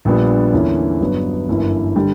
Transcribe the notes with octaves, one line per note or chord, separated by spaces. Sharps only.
A#1 A#2 G3 B3 D4
E2 D3 A#3 C#4 E4
G1 G2 F#3 B3 D4
G1 F#2 E3 A#3 E4
D3 G3